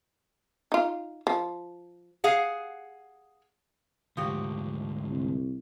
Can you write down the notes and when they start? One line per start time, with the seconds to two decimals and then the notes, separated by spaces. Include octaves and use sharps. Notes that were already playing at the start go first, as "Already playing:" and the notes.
0.72 D#4 F4
1.27 F3
2.24 G#4 F5 F#5
4.17 D2 G#2 F3 F#4 G4
5.07 C2